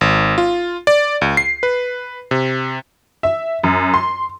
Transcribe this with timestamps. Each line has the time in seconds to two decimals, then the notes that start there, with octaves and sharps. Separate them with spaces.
0.01 G#1
0.38 F4
0.87 D5
1.21 C#2
1.37 C7
1.63 B4
2.31 C3
3.23 E5
3.64 F#2
3.94 C6